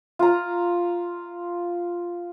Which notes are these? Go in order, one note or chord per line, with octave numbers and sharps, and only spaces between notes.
F4 A#5